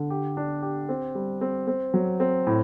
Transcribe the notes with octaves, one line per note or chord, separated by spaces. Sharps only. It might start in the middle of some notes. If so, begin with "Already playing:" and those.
Already playing: D3
G4
D4
G4
C4
G3
C4
C4
F#3
C4
A2